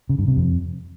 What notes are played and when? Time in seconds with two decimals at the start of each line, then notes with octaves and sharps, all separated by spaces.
0.09 C#3
0.19 G2
0.28 C3
0.37 F2